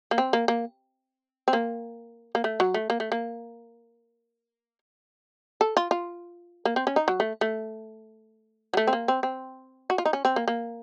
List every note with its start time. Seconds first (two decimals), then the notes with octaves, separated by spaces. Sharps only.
0.11 A#3
0.18 C4
0.33 A#3
0.48 A#3
1.48 C4
1.53 A#3
2.35 A#3
2.44 A3
2.60 F#3
2.74 A3
2.90 A#3
3.00 A3
3.12 A#3
5.61 A4
5.77 F4
5.91 F4
6.65 A#3
6.76 C4
6.87 C#4
6.96 D#4
7.08 F#3
7.20 A3
7.41 A3
8.74 F#3
8.77 A3
8.87 C4
8.93 A#3
9.08 C4
9.23 C4
9.90 F#4
9.98 F4
10.05 D#4
10.13 C#4
10.25 C4
10.36 A#3
10.48 A#3